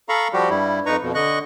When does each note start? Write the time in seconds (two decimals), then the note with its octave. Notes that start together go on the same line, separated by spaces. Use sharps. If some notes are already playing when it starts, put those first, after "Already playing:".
0.09 A4 F5 A#5 B5 C#6
0.33 F3 G3 F#4 G4
0.50 G2 G3 E4
0.86 F2 D#4 B4 A#5 C#6
1.02 F2 B2
1.15 D3 D#5 C#6 F#6